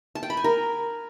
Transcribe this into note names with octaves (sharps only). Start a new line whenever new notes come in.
A5
G5
B5
G#5
A#4